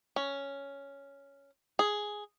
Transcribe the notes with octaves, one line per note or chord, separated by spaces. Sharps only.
C#4
G#4